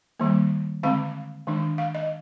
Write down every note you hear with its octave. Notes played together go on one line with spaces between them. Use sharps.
D#3 G3 A#3
D3 G#3 C4 F5
D#3 G#3 D4
F5
D#5